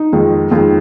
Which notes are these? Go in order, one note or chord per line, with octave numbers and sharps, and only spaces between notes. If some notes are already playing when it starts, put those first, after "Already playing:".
Already playing: D#4
F2 D#3 G#3
F2 D#3 G#3 F4